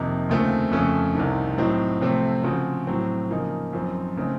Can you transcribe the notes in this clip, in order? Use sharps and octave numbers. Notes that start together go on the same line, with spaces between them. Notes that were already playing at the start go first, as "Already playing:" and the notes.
Already playing: F2 C3 D#3 A#3 D#4
D#2 C#3 A3 C4 F4
F2 C#3 A3 C#4 A4
C2 C3 D#3
A2 F#3 C4 D#4
C3 F3 A3 C4
C#3 F3 C4 F#4
A2 F#3 C4
C#3 F3 A#3 D#4
F#2 F3 C4 D#4
C#3 A3 C4 D#4